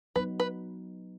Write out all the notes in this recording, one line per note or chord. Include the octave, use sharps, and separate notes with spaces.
F#3 B3 D#4 B4
B4